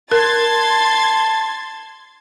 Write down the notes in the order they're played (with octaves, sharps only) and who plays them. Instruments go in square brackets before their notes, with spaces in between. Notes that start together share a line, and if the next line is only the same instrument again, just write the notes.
[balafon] A#4 [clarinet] A5 [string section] C6 G#6 A6